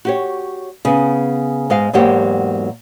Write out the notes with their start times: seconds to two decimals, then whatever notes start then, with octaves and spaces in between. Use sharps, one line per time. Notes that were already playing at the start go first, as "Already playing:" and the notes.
0.05 F#4 G4 C#5
0.85 C#3 B3
1.70 G#2 G#3 D#5 F5
1.93 E2 G#2 F#3 A#3 G4 F#5